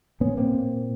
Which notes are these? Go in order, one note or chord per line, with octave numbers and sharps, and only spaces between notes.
A#2 B3 C#4
A#3 C4
A#2